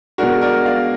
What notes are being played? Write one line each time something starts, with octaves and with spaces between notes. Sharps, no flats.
B2 G#3 D4 F#4 A#4
A#4 D5
D5 F5